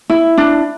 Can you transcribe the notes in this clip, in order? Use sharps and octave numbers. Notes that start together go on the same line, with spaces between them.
E4
D4